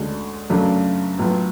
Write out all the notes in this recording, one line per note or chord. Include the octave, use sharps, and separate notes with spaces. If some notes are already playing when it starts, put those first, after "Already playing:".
Already playing: D2 D3 G#3 C#4
F#2 C#3 F#3 A3 D4
A2 F#3 B3 F4